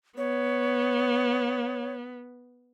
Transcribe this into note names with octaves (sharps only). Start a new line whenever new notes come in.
B3 C#5